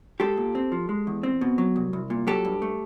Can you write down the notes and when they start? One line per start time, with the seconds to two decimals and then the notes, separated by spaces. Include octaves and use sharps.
0.20 G#3 G4 A4
0.37 A#2
0.55 C4
0.72 F3
0.89 G#3
1.07 E2
1.23 C4
1.41 B2
1.58 F#3
1.76 C2
1.93 C2
2.10 A#2
2.27 F#3 G4 A4
2.45 G2
2.62 A3